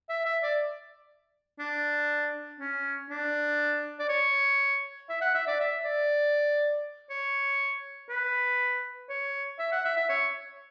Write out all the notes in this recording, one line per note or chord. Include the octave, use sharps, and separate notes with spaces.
E5
E5
D5
D4
C#4
D4
D5
C#5
E5
F#5
E5
D5
E5
D5
C#5
B4
C#5
E5
F#5
E5
E5
C#5